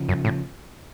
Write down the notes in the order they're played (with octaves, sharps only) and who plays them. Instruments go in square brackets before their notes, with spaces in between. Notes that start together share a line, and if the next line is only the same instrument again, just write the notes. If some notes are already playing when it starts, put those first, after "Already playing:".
Already playing: [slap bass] C#3 F3
[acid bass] F#2
A2